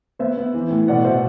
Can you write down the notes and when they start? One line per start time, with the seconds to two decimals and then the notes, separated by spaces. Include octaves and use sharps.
0.19 B3 C5 E5
0.37 B3
0.54 E3
0.71 A2
0.88 B2 D5 F#5
1.05 B2 C5 E5